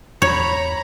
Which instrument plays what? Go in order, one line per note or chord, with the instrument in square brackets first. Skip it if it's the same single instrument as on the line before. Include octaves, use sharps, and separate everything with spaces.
[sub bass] E2 [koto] C#5 [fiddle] A#5 B5